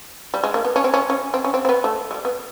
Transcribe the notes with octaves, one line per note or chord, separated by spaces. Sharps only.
G3
G#3
A#3
B3
C#4
C4
C#4
C#4
C4
C#4
C4
C4
B3
A3
G#3
G3
B3